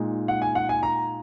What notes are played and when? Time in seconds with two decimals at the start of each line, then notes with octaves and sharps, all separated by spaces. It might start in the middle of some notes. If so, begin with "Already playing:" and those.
Already playing: A#2 G#3 D#4
0.28 F#5
0.42 G#5
0.55 F#5
0.69 G#5
0.83 A#5